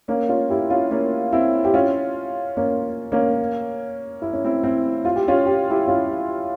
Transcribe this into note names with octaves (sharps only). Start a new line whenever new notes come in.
A#3 C#4
C#4 F4
E4 G4
C#4 F4
A#3 C#4
C4 E4
G4
C#4 F4
A#3 C#4
A#3 C#4
E4
C#4
C4 E4
C4 E4
F4
G4
C#4 F4
G4
E4 G4
C#4 F4